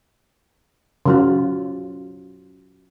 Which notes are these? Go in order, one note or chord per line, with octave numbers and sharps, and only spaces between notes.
C#3 F#3 F4